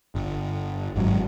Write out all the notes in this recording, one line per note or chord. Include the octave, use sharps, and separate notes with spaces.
G1
G#1 G#2 F#3